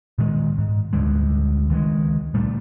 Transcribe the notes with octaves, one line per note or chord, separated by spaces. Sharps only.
A#2 D#3 G#3
G#2
D2 D3 G3 G#3
C#2 D#3 G3 G#3
A#2 G3 A3